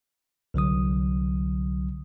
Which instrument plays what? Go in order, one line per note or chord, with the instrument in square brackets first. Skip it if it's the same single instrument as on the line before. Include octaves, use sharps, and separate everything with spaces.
[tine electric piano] C2 D3 F#3 D#6